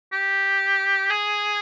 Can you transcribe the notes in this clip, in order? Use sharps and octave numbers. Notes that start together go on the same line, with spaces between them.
G4
G#4